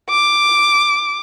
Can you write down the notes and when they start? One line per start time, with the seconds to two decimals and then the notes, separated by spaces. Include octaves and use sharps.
0.10 D6